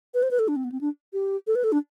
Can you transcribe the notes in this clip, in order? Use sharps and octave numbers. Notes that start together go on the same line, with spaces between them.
B4
C5
B4
A4
D4
C4
B3
C4
D4
G4
A4
B4
A4
D4